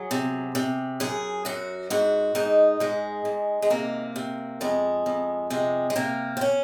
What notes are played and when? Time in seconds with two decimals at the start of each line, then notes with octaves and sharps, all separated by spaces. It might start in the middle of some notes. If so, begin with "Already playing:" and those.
Already playing: F#3 G#4
0.11 C3
0.55 C3
1.00 F#2 G#4
1.45 F#2 F#4
1.90 G#2 F#4
2.35 G#2 D#4
2.80 G#2 G#3
3.25 G#2
3.62 G#3
3.70 C3 A#3
4.16 C3
4.61 F2 G#3
5.06 F2
5.50 C3 G#3
5.90 G#3
5.96 C3 A#3
6.37 C4
6.41 C#4